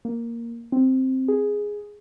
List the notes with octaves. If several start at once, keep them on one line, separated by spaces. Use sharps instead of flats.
A#3
C4
G#4